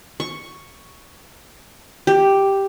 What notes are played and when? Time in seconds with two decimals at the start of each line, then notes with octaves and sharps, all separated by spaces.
0.20 C#6
2.07 G4